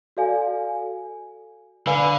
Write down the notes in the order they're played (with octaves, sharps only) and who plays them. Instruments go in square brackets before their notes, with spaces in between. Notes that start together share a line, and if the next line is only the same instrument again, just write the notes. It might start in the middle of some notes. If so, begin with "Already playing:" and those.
[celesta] F#4 A4 D5 F5 G#5
[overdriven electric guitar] D3 [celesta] B4 D5 F5 G#5 B5